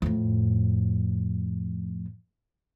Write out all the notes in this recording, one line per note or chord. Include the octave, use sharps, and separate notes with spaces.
F2 A2